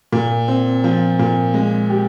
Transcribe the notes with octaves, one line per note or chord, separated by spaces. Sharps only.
A#2
C4
F3
A#2
G#3
G4